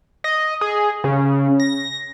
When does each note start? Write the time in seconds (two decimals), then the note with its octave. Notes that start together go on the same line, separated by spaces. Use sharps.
0.24 D#5
0.61 G#4
1.04 C#3
1.60 A#6